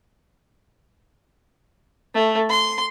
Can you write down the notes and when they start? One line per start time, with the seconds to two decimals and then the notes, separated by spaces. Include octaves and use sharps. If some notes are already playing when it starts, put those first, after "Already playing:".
2.14 A3
2.49 C6